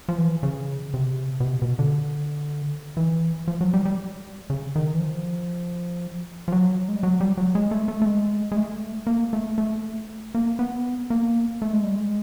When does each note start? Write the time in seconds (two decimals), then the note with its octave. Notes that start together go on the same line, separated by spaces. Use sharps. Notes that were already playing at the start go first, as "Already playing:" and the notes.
0.09 F3
0.18 E3
0.43 C#3
0.94 C3
1.40 B2
1.44 C3
1.62 B2
1.79 D3
2.97 E3
3.48 F3
3.61 F#3
3.74 G3
3.85 G3
4.50 C#3
4.76 D#3
4.94 E3
5.00 F3
6.48 F3
6.52 F#3
6.88 G#3
6.96 G3
7.03 F#3
7.21 G3
7.37 F#3
7.55 G#3
7.71 A3
7.88 A3
8.02 A3
8.06 G#3
8.52 G#3
8.56 A3
9.07 A#3
9.33 A3
9.58 A3
10.35 A#3
10.59 B3
11.10 A#3
11.62 A3
11.73 G#3
11.84 G3
11.96 G#3